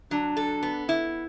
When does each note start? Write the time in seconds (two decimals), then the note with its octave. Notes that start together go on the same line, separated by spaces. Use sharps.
0.11 F#3 D4
0.37 A4
0.63 B3
0.89 E4